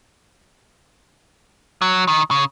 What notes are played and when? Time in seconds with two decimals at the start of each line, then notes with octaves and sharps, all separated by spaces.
1.82 F#3
2.08 D#3
2.31 C#3